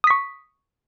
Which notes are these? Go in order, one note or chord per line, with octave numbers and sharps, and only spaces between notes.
C#6 D#6 B6